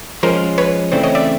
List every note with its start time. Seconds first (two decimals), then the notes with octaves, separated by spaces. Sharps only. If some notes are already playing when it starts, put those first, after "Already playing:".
0.23 F3 G#3 C#4 A#4 C5
0.58 B4 C#5
0.92 C#3 E3 A3 C4 C5 D5
1.03 C#5 D#5
1.15 D5 E5